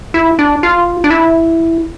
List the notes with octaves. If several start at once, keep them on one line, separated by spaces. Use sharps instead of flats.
E4
D4
F4
D4
E4